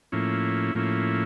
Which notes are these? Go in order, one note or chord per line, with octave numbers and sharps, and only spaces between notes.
A2 F3 A#3 C#4 E4
A2 F3 A#3 C#4 E4